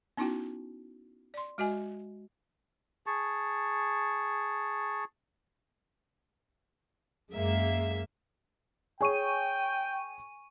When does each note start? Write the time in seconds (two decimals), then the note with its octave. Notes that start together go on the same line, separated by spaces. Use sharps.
0.17 B3 C#4 D#4 E4 F#4 G5
1.34 D5 C6
1.58 G#3 F#4 D#5 G#5
3.07 G#4 A5 C#6
7.33 F#2 G#3 A#3 E5
9.01 G#4 C#5 G5 G#5 C#6 D#7